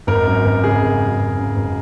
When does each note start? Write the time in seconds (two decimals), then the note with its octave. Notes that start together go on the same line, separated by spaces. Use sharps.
0.07 G#1 A#4
0.27 F#2
0.45 G#1
0.63 C#3 G#4
0.82 G#1
1.01 F#2
1.19 G#1
1.38 C#3
1.56 G#1